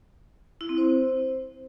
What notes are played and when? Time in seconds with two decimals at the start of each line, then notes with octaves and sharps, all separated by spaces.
0.61 E4
0.69 C4
0.78 C5